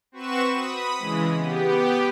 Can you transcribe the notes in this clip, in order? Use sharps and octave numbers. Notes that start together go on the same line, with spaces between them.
C4 F#4 B4 C#6 E7
B5 D#6
C#3 E3 G#3
B3 G4